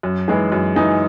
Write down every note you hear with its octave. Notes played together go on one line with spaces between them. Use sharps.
F#2
E3 G#3 D#4 G#4
F#2
E3 G#3 D#4 G#4